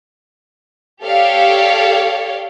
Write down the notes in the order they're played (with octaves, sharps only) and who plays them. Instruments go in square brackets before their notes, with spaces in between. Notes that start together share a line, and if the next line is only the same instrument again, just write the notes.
[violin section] G4 A4 C#5 D5 F5